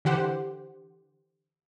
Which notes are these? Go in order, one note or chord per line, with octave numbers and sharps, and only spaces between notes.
D3 E3 G4 C5 F#5